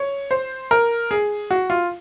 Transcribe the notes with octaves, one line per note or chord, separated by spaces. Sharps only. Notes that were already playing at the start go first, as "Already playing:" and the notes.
Already playing: C#5
C5
A#4
G#4
F#4
F4